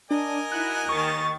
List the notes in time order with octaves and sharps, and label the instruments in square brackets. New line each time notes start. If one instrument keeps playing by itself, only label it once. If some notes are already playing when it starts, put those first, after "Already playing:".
[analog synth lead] D4 [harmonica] A#4 D#5 G#5
[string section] D#4 E4 F#4 [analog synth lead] F#6
[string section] D#2 D#3 A6 [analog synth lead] C#6